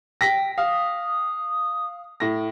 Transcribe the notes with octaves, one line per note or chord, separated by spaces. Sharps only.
G5 A#6 B6
F5 D#6
A2 A#6